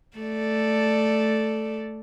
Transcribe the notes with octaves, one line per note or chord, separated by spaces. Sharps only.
A3 A4 D5